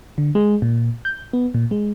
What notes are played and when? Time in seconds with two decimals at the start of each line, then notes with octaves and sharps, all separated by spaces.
0.18 D3
0.35 G#3
0.62 A#2
1.05 G6
1.33 B3
1.54 A#2
1.71 G#3